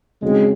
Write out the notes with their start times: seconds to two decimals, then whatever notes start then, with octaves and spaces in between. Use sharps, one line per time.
0.22 C#3 F#3 G#3 C4 D#4